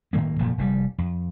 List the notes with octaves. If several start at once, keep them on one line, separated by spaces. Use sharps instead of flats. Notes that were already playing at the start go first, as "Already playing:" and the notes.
A2 D#3 A3 A#3
F1 A#2 F3 A3
F1 G#2 G3
F2